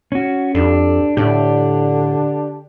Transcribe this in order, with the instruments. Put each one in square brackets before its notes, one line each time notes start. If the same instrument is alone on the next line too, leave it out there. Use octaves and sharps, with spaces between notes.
[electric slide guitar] C#4 F#4
[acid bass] F2 [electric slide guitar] D4 [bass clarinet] G4 [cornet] A4
[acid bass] A2 [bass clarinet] D3 [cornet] D4 [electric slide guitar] G4 D5